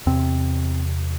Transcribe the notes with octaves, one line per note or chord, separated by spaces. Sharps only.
E2 C3 C4